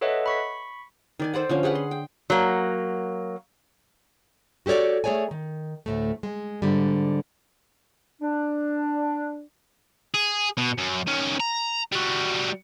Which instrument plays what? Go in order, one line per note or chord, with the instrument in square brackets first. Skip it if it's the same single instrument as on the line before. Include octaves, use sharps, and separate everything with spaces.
[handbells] A4 B4 C#5 D#5 E5 F#5
B5 C#6 B6
[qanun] D#3 D5 G#5
A4 C5 D5 F#5
D3 F3 C#4
G4 G#4 B4 F#5
C6
G5
[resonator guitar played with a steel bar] F#3 A#3
[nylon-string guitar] F#4 G4 A4 C#5 D5
A3 G#4 C#5 D5 G#5
D#3
D2 A2 A3
G#3
G#2 D3 G3
[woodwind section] D4
[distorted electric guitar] G#4
B2
F#2
D#3 C#4
A#5
G3 F#4